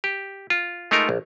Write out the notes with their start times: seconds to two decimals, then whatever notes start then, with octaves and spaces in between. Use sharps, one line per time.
0.04 G4
0.50 F4
0.91 G#3 A3 D#4 F4 A#4
1.09 A#1